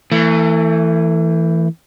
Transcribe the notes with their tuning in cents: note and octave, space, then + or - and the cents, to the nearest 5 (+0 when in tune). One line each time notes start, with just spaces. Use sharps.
E3 +0 A3 +35